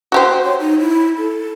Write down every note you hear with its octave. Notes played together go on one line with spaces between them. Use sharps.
F#4 G4 C5
C#5
D#4
E4
A4